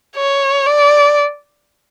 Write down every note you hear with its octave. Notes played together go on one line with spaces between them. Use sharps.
C#5
D5